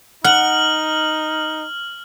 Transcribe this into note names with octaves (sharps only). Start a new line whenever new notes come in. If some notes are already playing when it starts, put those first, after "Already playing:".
D#4 F#5 F6 F#7